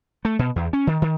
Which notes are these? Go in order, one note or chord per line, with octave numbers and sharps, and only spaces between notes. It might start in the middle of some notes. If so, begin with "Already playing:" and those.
A3
B2
E2
C#4
D#3
D#3